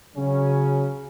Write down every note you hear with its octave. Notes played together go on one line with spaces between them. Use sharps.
C#3 F#3 C#4